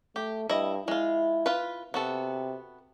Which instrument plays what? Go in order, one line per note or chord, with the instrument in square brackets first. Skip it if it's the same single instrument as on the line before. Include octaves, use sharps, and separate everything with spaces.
[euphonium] A3 [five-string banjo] G4
[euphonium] G2 [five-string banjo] E4 D#5
[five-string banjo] G#3 F4 [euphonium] E4
[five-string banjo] F4 B4
[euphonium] C3 [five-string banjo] B3 F#4 A4